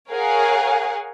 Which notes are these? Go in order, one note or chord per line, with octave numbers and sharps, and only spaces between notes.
G#4 A#4 C#5 F5 F#5 G#5